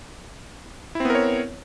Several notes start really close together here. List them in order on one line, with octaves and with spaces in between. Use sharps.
E4 C4 B3 A#4 C#5